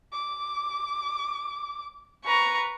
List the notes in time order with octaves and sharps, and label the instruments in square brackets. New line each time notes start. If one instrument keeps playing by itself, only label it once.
[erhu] D6
[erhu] B4 [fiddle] A#5 C#6